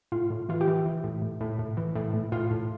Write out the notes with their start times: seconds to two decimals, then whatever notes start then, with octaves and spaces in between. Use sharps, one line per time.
0.12 A2 F4
0.30 A2
0.49 E3 F4
0.61 G4
0.67 E3
0.86 E3
1.04 A2
1.22 A2
1.41 A2
1.59 A2
1.77 E3
1.95 A2
2.13 A2
2.32 A2 F4
2.51 A2